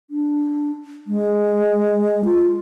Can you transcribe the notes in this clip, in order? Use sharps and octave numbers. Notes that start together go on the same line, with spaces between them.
D4
G#3
F4